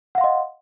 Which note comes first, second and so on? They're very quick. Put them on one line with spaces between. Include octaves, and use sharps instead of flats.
F#5 F5 C6 D#5